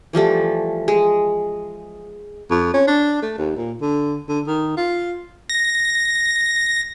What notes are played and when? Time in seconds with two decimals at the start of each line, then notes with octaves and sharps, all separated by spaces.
0.13 E3 F3 G3 A3
0.88 G#3
2.50 F2
2.74 C#4
2.87 D4
3.22 A3
3.38 D#2
3.56 A#2
3.82 D3
4.29 D3
4.47 D#3
4.77 F4
5.50 A#6